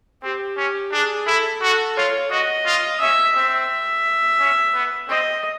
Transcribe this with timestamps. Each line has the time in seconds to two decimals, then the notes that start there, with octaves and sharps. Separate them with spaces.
0.23 C4 G4
0.57 C#4
0.92 D4 G#4
1.26 E4 A4
1.62 F#4 A4
1.97 F4 C#5
2.31 F#4 D#5
2.66 F4
3.01 C#4 E5
3.36 C4 E5
4.39 C#4
4.74 B3
5.09 C4 D#5